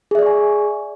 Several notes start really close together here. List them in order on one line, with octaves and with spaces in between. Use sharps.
G#4 E5 D5 C#6 G#5